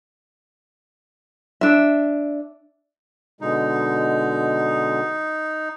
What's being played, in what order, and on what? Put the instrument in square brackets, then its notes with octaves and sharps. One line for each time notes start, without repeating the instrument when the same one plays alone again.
[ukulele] D4 E5
[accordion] B2 D3 G#3 [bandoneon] D#4